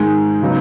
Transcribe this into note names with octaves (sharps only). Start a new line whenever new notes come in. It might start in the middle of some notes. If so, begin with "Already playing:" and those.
Already playing: G#2 D#3 G#3 D#4
C#3 F#3 B3 D#4